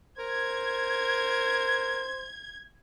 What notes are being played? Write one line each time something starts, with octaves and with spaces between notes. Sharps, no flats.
A#4 C5 G#6